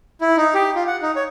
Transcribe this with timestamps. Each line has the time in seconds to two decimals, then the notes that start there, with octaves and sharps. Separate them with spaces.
0.21 E4
0.37 D#4
0.54 G4
0.75 F4
0.87 F#5
1.02 D#4
1.16 C#5